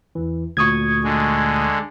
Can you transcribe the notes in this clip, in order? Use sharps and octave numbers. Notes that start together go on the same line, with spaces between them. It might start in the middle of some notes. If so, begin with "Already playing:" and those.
E2 E3
D2 A#2 C#6 D#6 G#6
D3 G#3